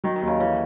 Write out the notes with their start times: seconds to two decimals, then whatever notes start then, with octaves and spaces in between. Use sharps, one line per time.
0.04 D#3 F#3
0.16 D#3
0.22 D#2
0.27 C#3
0.39 C#3 E3